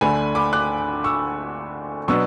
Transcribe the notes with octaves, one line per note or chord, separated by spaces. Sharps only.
D2 D3 A3 D4 G#5 B5
B5 D6
D6 F#6
C#6 E6
B2 F#3 B3 D4 C#6 E6